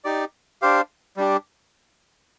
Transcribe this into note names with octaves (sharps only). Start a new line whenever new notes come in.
D#4 G4 D5
D4 G4 C5 F5
G3 D4 G4